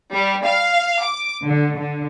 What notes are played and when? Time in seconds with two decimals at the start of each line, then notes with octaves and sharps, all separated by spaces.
0.12 G3
0.45 F5
1.02 D6
1.44 D3
1.75 D3